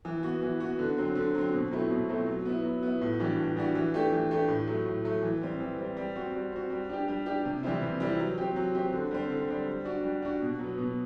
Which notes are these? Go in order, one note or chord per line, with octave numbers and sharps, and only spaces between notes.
E3
B3 F#4
E3
B3 F#4
D3
F#3 C4
D3
F#3 C4
B2
F#3 A3 C4 E4
B2
F#3 A3 C4 E4
F#3
B3 E4
F#3
B3 E4
A2
E3 G3 D4 F#4
A2
E3 G3 D4 F#4
E3
A3 D4 G4
E3
A3 D4 G4
A2
F#3 A3
A2
F#3 A3
E3
G3 C4
E3
G3 C4
G3
C4 F#4
G3
C4 F#4
G3
D4 G4
G3
D4 G4
C3
E3 G3 C4 E4
C3
E3 G3 C4 E4
F#3
C4 G4
F#3
C4 G4
D3
G3 C4
D3
G3 C4
G3
D4 F#4
G3
D4 F#4
B2
F#3 B3
B2